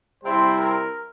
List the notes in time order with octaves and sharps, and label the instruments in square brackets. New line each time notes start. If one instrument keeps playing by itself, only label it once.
[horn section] C3 G3 C4 E4 [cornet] C5
[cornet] A#4